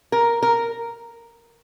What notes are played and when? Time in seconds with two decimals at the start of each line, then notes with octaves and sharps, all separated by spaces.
0.12 A#4
0.43 A#4